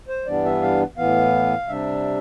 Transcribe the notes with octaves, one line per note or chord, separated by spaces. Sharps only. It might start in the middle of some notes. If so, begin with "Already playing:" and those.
C5
G2 E3 G3 B3 D4 D5
E5
F5
A2 E3 B3 F5
C3 G3 D4 E5